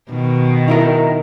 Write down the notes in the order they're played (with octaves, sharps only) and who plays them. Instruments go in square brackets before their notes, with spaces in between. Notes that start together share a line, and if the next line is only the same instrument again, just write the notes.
[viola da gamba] B2 D#3
[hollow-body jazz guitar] D#4 E4 A#4